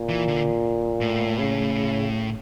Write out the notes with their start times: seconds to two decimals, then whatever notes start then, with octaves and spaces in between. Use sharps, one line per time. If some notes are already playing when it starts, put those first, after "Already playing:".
Already playing: A#2
0.10 E3
0.28 D3
1.01 A2
1.38 C#3